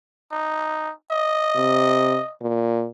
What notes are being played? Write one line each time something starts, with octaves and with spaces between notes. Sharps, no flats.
D#4
D#5
C3
A#2